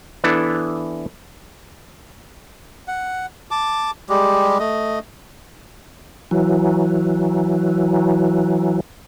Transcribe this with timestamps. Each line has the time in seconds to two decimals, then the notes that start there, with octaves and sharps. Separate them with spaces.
0.24 E3 B3 D4 E4 A4
2.88 F#5
3.51 A5 D6
4.09 G3 G#3 G4
4.59 A3 D#5
6.31 E3 F#3